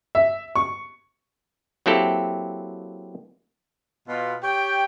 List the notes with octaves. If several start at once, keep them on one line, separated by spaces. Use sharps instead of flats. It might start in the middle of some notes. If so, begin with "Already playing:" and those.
E5
C#6
F#3 A#3 C4 E4 G4 A4
B2 F4
G4 C#5 G5